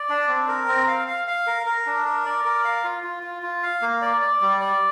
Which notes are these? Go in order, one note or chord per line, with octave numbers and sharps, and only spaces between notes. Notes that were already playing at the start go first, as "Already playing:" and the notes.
Already playing: D5
D4
C4
A#4
C4
F5
F5
F5
A#4
A#4
D4
A#4
D5
A#4
F5
F4
F4
F4
F4
F5
A#3
D5
D5
G3
D5